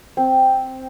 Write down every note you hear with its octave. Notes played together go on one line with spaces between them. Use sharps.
C4